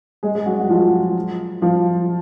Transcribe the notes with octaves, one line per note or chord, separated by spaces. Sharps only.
G#3 G#4
G#3 G#4
F#3 F#4
F#4
F3 F4
F3 F4